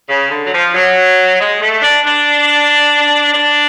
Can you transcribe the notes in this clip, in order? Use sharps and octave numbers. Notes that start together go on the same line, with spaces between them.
C#3
D3
F#3
F3
F#3
G#3
A3
D4
D4
D4